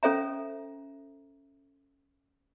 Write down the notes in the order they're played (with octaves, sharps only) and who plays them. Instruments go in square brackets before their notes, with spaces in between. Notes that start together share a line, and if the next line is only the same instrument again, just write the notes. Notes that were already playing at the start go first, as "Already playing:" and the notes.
[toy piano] C#4 A4 C5 E5 A#5